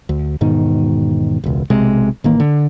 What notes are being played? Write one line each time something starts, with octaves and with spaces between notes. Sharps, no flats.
D2
E1 G#2 B2 D#3
E1 C#2
B1 C3 G#3
A1 D#3 A#3
D3